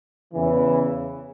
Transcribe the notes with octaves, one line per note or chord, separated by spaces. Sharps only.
E2 C#3 E3